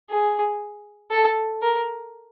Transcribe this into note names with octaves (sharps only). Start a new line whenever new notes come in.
G#4
A4
A#4